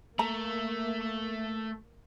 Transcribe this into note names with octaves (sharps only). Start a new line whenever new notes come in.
A3 A#3 A#5